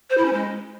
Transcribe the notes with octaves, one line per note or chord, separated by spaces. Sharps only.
C5
E4
C#4
G#3